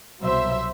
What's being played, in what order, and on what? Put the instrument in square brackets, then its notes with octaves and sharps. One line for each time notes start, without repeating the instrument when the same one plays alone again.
[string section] C2 B2 F#3 C5 E5